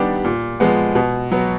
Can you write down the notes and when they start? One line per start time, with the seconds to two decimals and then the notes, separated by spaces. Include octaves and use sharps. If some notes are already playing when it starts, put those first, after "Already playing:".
Already playing: D#3 G3 B3 D4 G4
0.25 A#2
0.60 F3 G#3 B3
0.95 B2
1.32 F#3 B3